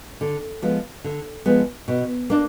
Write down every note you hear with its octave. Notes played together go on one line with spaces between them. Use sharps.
D3
F3 G#3 B3
D3
F3 G#3 B3
B2
A#3 D4